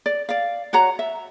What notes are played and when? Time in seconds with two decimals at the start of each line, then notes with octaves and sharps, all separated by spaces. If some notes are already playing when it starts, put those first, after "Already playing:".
0.06 D5
0.29 D5 F5
0.73 F#4 C#5 F#5 A#5
0.99 E5